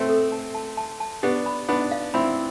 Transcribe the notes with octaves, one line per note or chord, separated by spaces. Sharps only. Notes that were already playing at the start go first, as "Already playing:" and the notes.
Already playing: A3 C4
A4
A5
A5
A5
A5
B3 D4 G4
B5
B3 D4 B5
F5
C4 E4 B5